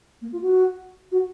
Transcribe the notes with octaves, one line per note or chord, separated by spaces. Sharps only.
A#3
F4
F#4
F#4